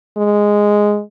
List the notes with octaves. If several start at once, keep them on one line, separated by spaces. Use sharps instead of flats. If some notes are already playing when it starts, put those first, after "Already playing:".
G#3